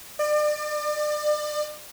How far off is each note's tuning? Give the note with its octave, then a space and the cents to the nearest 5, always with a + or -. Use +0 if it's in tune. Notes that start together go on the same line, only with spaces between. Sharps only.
D5 +35